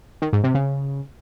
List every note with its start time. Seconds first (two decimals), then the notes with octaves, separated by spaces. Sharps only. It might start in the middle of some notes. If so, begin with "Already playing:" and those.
0.22 D#3
0.33 G#2
0.44 C3
0.54 C#3